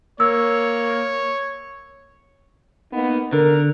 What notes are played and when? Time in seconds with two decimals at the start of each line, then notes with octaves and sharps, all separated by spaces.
0.20 A#3 C#5 E6
2.93 A#3 B3 D#4
3.33 D3 A#4